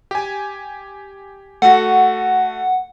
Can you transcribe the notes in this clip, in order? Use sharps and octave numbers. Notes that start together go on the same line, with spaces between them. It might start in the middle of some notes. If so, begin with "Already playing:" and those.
G4 G#5
A3 F#4 F#5